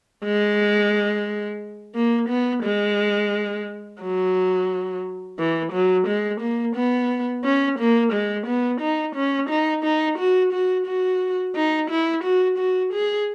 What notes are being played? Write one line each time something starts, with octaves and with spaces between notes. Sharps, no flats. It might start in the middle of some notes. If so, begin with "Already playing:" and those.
G#3
A#3
B3
G#3
F#3
E3
F#3
G#3
A#3
B3
C#4
A#3
G#3
B3
D#4
C#4
D#4
D#4
F#4
F#4
F#4
D#4
E4
F#4
F#4
G#4